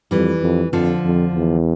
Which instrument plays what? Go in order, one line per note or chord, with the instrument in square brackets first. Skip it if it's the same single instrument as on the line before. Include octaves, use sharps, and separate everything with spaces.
[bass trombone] F2 [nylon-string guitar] E3 G3
[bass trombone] F2
[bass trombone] F2 [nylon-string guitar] D3 F3
[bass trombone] F2
E2